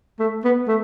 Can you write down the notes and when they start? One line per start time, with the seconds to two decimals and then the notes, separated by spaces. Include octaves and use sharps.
0.20 A3
0.45 B3
0.68 A3